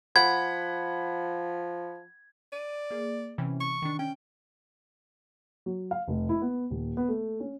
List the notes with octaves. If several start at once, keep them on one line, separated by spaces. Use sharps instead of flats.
F3 F#5 B5 G#6
D5 D#7
A#3 G#4
C3 E3 C#4
C#6
D#3 D4
C#4 G5
F#3
F5
F1
E4
B3
D#1
B3
A3
C#4